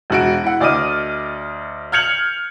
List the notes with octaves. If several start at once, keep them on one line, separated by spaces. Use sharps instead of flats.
E1 F#4 D7
E4 F#5
D2 D5 D#5 D6 F6 D#7
F6 G6 G#6 C#7 F7 F#7